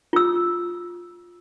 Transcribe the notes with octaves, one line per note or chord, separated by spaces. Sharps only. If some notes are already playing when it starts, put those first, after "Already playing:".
F4 E6